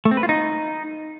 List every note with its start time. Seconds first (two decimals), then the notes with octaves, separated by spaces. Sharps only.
0.05 A3
0.11 C4
0.17 B4
0.23 F4
0.29 D#4